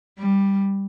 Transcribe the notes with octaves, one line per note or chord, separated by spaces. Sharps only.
G3